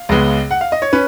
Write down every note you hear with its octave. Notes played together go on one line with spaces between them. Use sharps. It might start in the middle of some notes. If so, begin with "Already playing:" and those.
Already playing: F5
C#2 C#3 G#3 B3
F#5
F5
D#5
C#5
C#4 B4